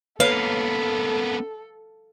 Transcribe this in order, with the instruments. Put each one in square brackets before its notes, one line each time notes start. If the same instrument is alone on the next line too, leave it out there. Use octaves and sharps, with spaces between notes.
[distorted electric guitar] A#3 B3 [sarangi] A4 [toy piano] B4 C#5 [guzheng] F5